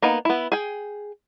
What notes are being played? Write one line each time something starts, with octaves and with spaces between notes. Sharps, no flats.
A#3 B3 D#4
B3 E4
G#4 G5